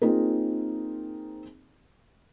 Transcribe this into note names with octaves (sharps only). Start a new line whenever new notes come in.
A#3 C4 D#4 F4 G#4 A#4